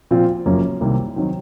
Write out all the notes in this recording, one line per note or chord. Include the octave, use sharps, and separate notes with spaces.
A#2 F3 C4 F4
F#1 F#2 F3 A#3 C#4
C2 C3 D#3 A#3
D#3 F#3 C4